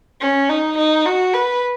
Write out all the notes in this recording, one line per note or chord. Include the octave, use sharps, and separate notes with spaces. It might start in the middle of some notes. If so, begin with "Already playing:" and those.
C#4
D#4
D#4
F#4
B4